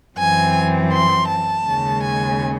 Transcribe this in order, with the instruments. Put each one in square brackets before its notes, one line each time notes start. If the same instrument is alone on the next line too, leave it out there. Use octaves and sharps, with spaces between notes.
[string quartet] F#2 E3 C4 G#5
C6
A5
D#2 C#3 G#3 C#4
G#5